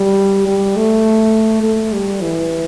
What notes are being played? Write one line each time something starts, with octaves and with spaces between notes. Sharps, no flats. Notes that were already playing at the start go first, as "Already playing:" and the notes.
Already playing: G3
G3
A3
A3
G3
E3